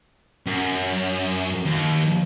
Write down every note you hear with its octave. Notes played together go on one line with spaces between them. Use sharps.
F#2
D#2